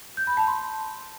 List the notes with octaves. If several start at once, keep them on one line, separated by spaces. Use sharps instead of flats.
G6
B5
A5
C6